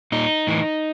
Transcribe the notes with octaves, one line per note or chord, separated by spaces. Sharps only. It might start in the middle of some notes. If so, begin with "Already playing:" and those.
A#2 D#4
A2 E3